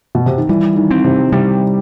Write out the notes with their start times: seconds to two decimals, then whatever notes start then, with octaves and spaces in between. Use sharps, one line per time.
0.15 B2
0.26 C3
0.38 D#3
0.49 E3 G3
0.76 D#3
0.91 C4
1.04 C3
1.32 C3 G3